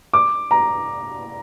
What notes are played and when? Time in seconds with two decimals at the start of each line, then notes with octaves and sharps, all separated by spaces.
0.14 D6
0.51 A#5